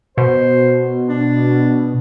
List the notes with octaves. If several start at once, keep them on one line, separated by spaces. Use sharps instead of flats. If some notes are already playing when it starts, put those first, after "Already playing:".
B2 C5
D4